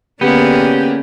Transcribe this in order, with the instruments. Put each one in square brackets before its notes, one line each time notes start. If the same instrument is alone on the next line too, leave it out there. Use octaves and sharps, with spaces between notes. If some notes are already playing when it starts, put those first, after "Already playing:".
[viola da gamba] D3 A#3 G#4 [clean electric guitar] B3 [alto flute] C#4 [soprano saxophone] G4